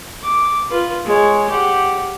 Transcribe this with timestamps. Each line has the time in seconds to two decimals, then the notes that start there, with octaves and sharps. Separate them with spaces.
0.22 D6
0.70 F4 B4
1.04 G#3 C#5
1.49 G4 F#5